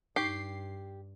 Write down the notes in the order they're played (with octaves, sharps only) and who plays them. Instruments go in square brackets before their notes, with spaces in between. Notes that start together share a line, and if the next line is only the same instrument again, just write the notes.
[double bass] G2 [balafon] D#4 [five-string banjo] G4 [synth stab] C7